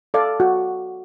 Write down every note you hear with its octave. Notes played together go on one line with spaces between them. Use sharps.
A4 D5 F5
F#4